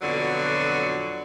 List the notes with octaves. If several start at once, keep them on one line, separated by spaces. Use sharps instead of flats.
F2 B2 D3 F#3